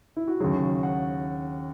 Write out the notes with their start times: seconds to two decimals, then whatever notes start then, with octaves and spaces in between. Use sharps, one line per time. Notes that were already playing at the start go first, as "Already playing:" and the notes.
0.16 E4
0.28 F#4
0.40 D#2 C#3 F#3 G#4
0.83 F#5